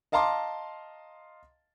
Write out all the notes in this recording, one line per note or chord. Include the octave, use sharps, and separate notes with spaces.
D#5 F5 A5 A#5 C6 D6